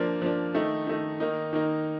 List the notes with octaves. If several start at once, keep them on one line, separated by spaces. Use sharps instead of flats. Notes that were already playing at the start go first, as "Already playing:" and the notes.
Already playing: F3 A#3 D4
F3 A#3 D4
D#3 A3 D#4
D#3 A3 D#4
D#3 A#3 D#4
D#3 A#3 D#4